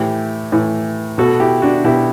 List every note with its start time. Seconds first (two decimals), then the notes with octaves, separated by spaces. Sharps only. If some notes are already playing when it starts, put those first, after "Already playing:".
Already playing: A2 E3 E4 G4
0.52 A2 E3
1.18 B2 F#4 A4
1.40 E4 G4
1.62 D4 F#4
1.84 B2 E4 G4